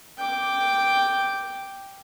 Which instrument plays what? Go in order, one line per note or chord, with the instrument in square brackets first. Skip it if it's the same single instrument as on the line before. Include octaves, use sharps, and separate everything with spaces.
[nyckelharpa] G5 D6